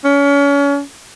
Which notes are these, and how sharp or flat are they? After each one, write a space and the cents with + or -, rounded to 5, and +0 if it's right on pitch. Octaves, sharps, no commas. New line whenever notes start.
C#4 +35